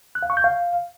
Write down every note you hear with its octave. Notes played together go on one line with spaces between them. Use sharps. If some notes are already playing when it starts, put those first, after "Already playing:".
F#6
F5
C#6
G6
F5